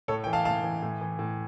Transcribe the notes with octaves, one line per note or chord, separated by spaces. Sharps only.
A2 A4 C#5
E3 G5
F5 A5
A2 F5 A5
E3
A2
E3
A2